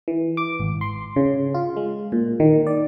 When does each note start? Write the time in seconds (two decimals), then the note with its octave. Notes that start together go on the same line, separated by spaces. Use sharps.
0.08 E3
0.37 D6
0.60 G#1
0.81 C6
1.16 C#3
1.54 F4
1.77 G#3
2.12 A#2
2.40 D#3
2.67 D5